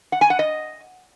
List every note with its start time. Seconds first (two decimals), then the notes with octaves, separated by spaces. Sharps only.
0.12 F#5
0.21 G#5
0.30 F#5
0.39 D#5